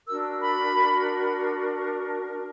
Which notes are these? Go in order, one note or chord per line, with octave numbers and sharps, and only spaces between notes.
D4 F#4 A#4 E6
B5